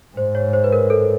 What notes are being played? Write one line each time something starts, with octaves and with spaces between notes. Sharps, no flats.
G#2 C5
C#5
C5
B4
A#4
A4